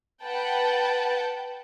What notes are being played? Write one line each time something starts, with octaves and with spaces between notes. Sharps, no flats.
B4 F#5 G5 A5